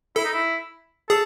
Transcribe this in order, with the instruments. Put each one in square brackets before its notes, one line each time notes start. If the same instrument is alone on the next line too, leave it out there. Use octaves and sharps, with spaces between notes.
[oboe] E4 [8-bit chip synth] A4
[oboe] D#4
E4
[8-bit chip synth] G#4 [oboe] A4